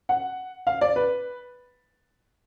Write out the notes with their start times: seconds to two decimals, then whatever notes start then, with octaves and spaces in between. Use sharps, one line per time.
0.09 F#5
0.67 F5
0.81 D5
0.96 B4